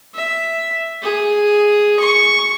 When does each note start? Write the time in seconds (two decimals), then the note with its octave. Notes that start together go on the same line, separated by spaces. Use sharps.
0.14 E5
1.03 G#4
1.99 C#6